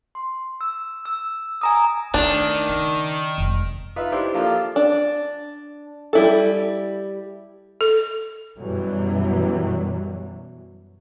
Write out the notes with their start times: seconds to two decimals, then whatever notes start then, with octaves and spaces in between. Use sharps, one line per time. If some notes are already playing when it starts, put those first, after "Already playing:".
0.15 C6
0.61 E6
1.05 E6
1.61 G#5 A#5 D#6
2.14 D#3 A3 D4
2.69 C#3
3.38 F1 G#3
3.96 D#4 F4 B4 E5
4.12 D4 E4 G4 C5
4.34 F3 A#3 D4 F4 G4 A4
4.76 D4
6.13 G3 E4 A4
7.81 A4
8.58 F#2 B2 E3 F#3 G3